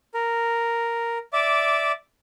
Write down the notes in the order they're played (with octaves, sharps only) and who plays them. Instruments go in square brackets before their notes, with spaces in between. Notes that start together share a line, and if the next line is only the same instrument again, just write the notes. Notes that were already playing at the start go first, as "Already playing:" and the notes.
[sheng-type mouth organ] A#4
D5 E5 D6